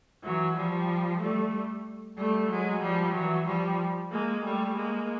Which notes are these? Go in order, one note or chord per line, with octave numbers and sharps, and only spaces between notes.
E3 F#3
F3 G3
G3 A3
G3 A3
F#3 G#3
F3 G3
E3 F#3
F3 G3
G#3 A#3
G3 A3
G#3 A#3